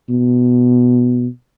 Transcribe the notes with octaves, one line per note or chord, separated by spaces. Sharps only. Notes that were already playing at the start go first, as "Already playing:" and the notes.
B2